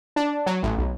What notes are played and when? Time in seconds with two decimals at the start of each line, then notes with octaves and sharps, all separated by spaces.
0.16 D4
0.46 F#3
0.63 A1
0.78 B1